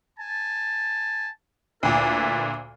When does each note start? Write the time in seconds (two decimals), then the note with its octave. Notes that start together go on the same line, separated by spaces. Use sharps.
0.19 G#5 A5
1.83 D2 A#2 E4 A4 B4